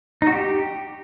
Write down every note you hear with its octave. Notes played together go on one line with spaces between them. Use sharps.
D#4
F#4
G4